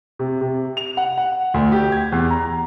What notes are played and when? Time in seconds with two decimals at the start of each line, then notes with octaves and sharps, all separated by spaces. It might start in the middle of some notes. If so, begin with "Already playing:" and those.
0.19 C3
0.41 C3
0.77 F7
0.97 F#5
1.18 F#5
1.54 D2
1.72 G4
1.92 G#6
2.12 E2
2.30 A#5